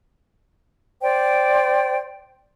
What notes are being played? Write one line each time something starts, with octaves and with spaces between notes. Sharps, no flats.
C5 D5 G5